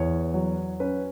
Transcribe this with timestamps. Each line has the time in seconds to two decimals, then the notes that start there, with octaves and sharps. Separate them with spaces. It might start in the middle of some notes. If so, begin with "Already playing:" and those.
Already playing: E2 C#5
0.34 F#3
0.80 C#4 B4